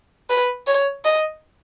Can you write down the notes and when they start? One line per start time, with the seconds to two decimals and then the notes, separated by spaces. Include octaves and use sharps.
0.30 B4
0.67 C#5
1.05 D#5